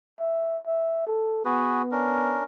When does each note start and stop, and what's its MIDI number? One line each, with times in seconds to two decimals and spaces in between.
0.20 0.58 76
0.66 1.02 76
1.07 1.40 69
1.45 2.42 59
1.45 1.82 66
1.45 1.82 68
1.45 1.82 71
1.92 2.44 61
1.92 2.44 62
1.92 2.44 70